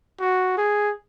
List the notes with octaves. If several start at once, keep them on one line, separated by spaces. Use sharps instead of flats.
F#4
G#4